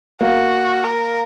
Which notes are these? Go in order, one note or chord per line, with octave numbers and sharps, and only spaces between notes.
A#3 F#4
A#4